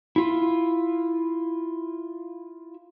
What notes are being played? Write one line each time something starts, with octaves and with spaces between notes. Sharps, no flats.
E4 F4